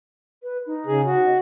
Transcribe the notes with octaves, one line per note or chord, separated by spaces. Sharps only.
B4
D#4
C#3 G#4
F#4
D#5